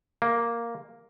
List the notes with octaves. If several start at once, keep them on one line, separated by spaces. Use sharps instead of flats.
A#3